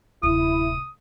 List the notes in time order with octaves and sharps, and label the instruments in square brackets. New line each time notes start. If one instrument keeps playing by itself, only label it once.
[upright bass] D1 C3 [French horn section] E4 [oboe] D#6